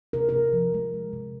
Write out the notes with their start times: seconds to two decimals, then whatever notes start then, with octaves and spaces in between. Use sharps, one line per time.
0.13 C3 A#4
0.29 C3 A#4
0.53 F3
0.74 G#3
0.94 G#3
1.13 C3